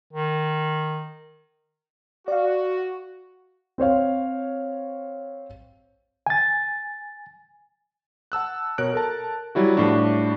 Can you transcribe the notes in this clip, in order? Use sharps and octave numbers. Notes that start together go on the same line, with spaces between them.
D#3
F#4 D5 F5
C4 C5 C#5 F5
G#5 A6
F#5 A5 E6 F#6
B2 A#4 C#5 F#6 D7
A4 A#4 A5
F#3 G3 E4 F#4
A2 F3 G3 D4 F#4